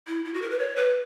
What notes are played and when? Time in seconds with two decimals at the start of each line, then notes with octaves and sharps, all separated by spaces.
0.07 E4
0.25 E4
0.34 F#4
0.42 A#4
0.50 B4
0.59 C#5
0.76 B4